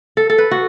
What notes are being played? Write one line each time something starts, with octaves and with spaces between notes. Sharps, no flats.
A4
A4
B4
F#4